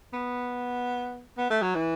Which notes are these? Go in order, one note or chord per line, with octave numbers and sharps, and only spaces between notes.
B3
B3
A3
F#3
E3